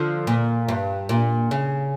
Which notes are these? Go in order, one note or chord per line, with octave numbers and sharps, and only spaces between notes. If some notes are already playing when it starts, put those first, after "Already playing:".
Already playing: D3 F3
A#2
G2
A#2
C#3